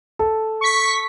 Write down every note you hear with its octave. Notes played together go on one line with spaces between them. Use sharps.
A4
C#6 B6